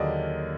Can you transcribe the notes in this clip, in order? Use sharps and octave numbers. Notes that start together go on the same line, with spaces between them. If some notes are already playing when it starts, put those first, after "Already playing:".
Already playing: D#2 D3 F#3 A#3 G#4 D5 D#5